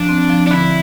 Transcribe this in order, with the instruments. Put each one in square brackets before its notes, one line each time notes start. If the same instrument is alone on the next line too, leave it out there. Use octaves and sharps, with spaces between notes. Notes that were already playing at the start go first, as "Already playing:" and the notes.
Already playing: [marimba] F3 [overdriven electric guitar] D4
[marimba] C4
F3
[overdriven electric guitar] D4
[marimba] D3 [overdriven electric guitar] E4